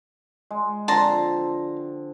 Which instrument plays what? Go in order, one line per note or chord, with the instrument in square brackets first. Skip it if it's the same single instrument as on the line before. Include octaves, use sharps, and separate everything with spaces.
[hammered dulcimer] G#3
[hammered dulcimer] D3 F3 C4 [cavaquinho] A5 A#5 C6